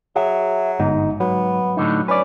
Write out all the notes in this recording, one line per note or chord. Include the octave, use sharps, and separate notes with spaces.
F#3 G#4 E5
G1 G#2 D#4
F#3 B3
A2 D3 D#4
C#4 B4 D5